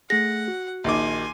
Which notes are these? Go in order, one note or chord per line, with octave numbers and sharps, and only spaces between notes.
A3 G#4 F#5 A#6
F#4
A#1 D#3 G#5 C6 D6